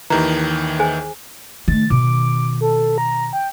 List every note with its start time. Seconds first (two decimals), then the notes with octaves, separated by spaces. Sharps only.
0.10 D#2 D#3 E3 G4 A#5
0.79 G#4 C5 G#5
1.68 D#3 A3 A6
1.90 B2 D#3 D6
2.61 A4
2.98 A#5
3.33 G5